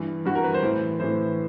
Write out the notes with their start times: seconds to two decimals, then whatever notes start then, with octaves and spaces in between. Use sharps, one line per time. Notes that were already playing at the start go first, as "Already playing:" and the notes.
Already playing: G2 E3
0.25 G2 E3 F#4
0.35 A#4
0.44 B4
0.54 C5
0.63 A2 E3
1.00 A2 E3 C5